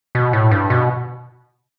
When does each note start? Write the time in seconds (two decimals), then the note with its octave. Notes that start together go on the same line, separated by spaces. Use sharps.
0.15 B2
0.33 A2
0.51 G2
0.70 B2